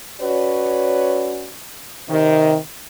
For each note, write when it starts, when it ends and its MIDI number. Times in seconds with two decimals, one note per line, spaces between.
0.21 1.51 61
0.21 1.51 66
0.21 1.51 71
0.21 1.51 73
0.21 1.51 74
2.09 2.57 48
2.09 2.57 51